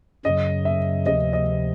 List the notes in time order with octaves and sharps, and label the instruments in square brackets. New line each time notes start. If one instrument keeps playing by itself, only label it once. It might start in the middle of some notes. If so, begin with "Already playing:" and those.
[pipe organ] F#2 C#3 F#3 [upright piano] D#5
[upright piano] E5
[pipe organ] D2 C3 F3 [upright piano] D#5
[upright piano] D#5